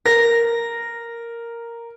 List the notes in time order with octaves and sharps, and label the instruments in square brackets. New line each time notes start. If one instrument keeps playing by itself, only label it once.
[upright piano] A#4 [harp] A#6